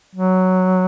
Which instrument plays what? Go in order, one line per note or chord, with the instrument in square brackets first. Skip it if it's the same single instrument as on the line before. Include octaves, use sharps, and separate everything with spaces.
[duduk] F#3